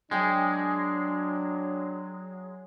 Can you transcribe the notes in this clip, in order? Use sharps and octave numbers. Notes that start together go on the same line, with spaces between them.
F#3 G#3 D4 G#4 G5